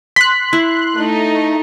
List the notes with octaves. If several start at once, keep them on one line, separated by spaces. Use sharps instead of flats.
C6 F#6 B6
E4
A3 D#4